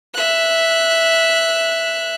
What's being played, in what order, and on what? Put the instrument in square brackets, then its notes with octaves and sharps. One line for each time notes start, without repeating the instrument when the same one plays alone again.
[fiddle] E5 F#6